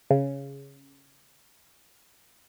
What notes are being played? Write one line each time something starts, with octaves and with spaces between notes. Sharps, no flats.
C#3